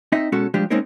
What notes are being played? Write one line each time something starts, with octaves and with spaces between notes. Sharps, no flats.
C4 D#4 D#5 E5
B2 G#3 C#4 F#4 A4
F3 G3 G#3 D4 G4
G#3 A#3 C4 C#4 D#4 A#4